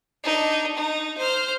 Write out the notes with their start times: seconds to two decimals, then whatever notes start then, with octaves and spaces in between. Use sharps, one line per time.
0.24 D4 D#4
0.77 D#4
1.18 C5 F6